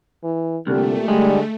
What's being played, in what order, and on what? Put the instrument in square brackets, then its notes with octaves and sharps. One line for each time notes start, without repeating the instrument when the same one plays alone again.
[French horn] E3
[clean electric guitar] C2 [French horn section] A#2 G4 [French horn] D3 [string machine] A3
[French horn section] D3 [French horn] G3 [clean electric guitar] G#3